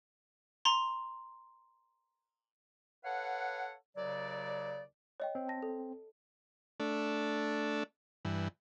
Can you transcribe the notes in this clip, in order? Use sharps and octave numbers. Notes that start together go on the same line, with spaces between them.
A#5 C6
A4 B4 C#5 F5 F#5
D#2 C#3 F#3 D5
C#5 D#5 G5
C4
A5 A#6
A4
A3 D4
G2 E3